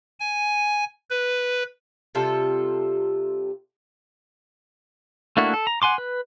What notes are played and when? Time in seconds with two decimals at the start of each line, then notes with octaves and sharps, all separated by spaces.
0.20 G#5
1.10 B4
2.15 C3 G3 F4 A4
5.37 A3 A#3 D4 E4 F#4
5.54 A4
5.67 A#5
5.82 F#5 G#5 C6 D6
5.98 B4